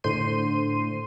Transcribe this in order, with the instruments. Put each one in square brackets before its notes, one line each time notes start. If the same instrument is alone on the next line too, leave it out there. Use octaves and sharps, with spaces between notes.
[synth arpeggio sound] A2 D3 C5 C6 D#7